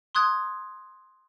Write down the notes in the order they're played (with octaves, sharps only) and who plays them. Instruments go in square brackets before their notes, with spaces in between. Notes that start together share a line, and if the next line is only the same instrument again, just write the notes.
[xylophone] C6 D#6 F#6 G#6